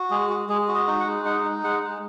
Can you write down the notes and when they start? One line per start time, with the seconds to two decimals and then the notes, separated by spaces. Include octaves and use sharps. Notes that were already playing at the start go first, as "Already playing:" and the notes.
Already playing: F#4
0.11 G#3 G#4
0.29 F#4
0.49 G#3 G#4
0.68 F#4
0.74 D#5
0.88 D#4
1.00 F#5
1.07 G#3
1.25 D#4 F#5
1.45 D#4
1.63 G#3 F#5
1.83 G#3